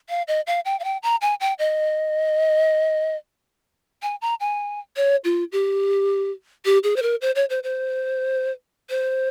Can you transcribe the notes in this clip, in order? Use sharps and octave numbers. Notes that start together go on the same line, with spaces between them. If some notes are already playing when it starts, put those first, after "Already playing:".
F5
D#5
F5
G5
F5
G5
A#5
G#5
G5
D#5
G#5
A#5
G#5
C#5
F4
G4
G4
G#4
C5
A#4
C5
C#5
C5
C5
C5